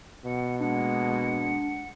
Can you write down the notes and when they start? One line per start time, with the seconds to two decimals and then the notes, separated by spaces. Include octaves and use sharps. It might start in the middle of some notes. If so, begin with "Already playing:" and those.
0.25 B2 F#5
0.60 G#3 A#3 D4 F#5